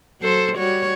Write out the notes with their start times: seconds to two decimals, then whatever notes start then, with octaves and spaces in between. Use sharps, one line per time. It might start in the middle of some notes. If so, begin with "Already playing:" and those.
0.21 F#3 A4 C5
0.57 G3 F#4 C#5